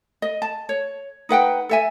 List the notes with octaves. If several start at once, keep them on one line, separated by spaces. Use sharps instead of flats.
D#5
A5
C#5
D#4 B4 F#5 G5
A4 E5 G#5